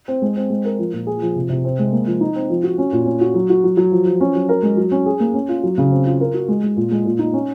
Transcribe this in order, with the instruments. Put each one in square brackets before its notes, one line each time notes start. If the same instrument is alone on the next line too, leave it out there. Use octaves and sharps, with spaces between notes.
[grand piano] C4
G#3
C4
G#3
A#4
F3
A#2
G#4
F3
C3
C3
C4
G#3
A#3
F3
D#4
C4
F3
F#4
C#4
A#2
C#4
F#4
F#3
F#4
F#3
F#3
F3
F3
C#4
F#3
A#4
G#3
F#3
C#4
G#4
A#3
C#4
F4
F#3
C#3
C4
F4
A#4
F#4
G#3
G#3
A#2
G#3
A#2
D#4
C#4